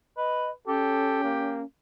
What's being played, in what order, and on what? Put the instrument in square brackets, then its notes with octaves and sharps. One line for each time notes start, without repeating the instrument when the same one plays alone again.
[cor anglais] B4 [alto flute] D#5
[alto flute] C#4 [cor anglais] G4 [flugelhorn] A4
[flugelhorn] A#3